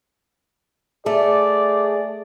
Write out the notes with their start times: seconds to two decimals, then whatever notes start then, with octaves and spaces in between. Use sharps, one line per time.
1.06 A3 G#4 D5